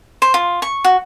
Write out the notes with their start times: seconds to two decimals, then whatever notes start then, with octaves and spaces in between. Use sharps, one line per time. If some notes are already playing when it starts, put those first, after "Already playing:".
0.22 C5
0.34 F4
0.62 C#6
0.84 F#4